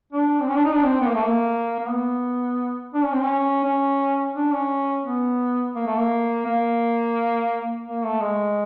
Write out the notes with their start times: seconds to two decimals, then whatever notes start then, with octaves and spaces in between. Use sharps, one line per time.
0.13 D4
0.40 C4
0.48 C#4
0.56 D4
0.65 D#4
0.74 D4
0.83 C4
1.01 B3
1.08 A#3
1.15 A3
1.23 A#3
1.80 A#3
1.89 B3
2.94 D4
3.03 C#4
3.12 C4
3.21 C#4
3.64 C#4
4.35 D4
4.52 C#4
5.05 B3
5.75 A#3
5.87 A3
5.98 A#3
6.46 A#3
7.87 A#3
8.04 A3
8.22 G#3